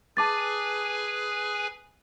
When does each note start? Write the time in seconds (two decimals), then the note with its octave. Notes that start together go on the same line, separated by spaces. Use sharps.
0.17 G#4 B4 G#5 A5 D6 A6